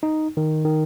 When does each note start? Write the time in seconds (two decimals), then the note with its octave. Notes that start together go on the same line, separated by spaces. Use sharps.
0.03 D#4
0.37 D#3
0.64 D#3